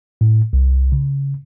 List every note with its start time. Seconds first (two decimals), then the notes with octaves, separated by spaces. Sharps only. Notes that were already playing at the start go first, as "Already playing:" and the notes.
0.21 A2
0.53 C2
0.92 C#3